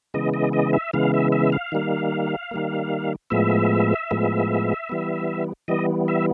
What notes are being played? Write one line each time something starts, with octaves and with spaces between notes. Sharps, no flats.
C#3 E3 G#3 B3 D#5
D#5
D#5
E5
C#3 E3 G#3 B3 F5
E5
E5
F5
D#3 G3 A#3
D#3 G3 A#3
A2 F3 G#3 B3 E5
A2 F3 G#3 B3
E3 G3 B3
E3 G3 B3 D#5
E5